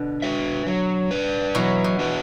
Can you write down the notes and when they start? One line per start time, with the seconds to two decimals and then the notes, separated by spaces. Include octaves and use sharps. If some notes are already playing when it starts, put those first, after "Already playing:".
Already playing: B2 D3
0.22 F#4 B4 E5
0.67 F#3
1.11 D4 B4
1.55 B2 E3 F#3
1.84 B2
1.99 D4 F#4 B4